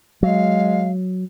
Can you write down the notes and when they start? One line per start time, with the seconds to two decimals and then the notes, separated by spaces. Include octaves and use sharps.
0.23 F#3 G#3 F5